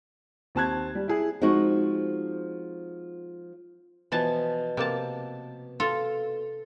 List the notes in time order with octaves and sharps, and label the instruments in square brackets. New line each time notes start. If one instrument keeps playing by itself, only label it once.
[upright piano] D#2 C4 A5 F#6 G#6
G3
E4 G#4
[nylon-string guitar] F3 G#3 C4 D#4 F#4
[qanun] B2 F3 B3 [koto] E3 A5
[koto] C3 A#3 A5
[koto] F4 [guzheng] A4